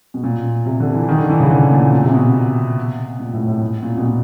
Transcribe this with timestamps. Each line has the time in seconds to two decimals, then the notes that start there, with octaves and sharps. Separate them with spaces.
0.14 B2
0.24 A#2
0.66 C3
0.80 D3
0.94 E3
1.08 D#3
1.18 D3
1.29 E3
1.40 C#3
1.50 D3
1.71 A#2
1.92 A#2
2.04 C3
2.14 B2
3.19 A#2
3.33 A2
3.47 A2
3.62 A2
3.82 A#2
3.97 B2
4.03 A#2